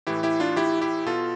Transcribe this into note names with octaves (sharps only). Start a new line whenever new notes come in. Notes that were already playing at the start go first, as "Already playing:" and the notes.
A2 E3 E4 G4
E4 G4
D4 F4
E4 G4
E4 G4
B2 F4 A4